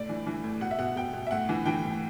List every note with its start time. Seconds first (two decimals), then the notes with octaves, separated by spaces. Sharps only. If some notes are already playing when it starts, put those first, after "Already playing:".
Already playing: A2 D5
0.09 E3
0.26 E3
0.44 A2
0.61 B2 F#5
0.71 E5
0.79 B2 F#5
0.96 B2 G5
1.13 B2
1.27 E5
1.31 A2 F#5
1.49 E3
1.66 E3 G5
1.83 A2